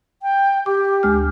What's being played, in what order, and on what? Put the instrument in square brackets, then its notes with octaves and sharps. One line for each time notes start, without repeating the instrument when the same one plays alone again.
[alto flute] G5
[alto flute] G4 [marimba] D6
[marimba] D2 G#3 F6